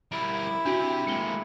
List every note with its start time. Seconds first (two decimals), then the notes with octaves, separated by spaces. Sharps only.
0.12 G3 E4 A#4
0.65 C4 D4 F#4 G4
1.07 G#3 A#3 C#7 G7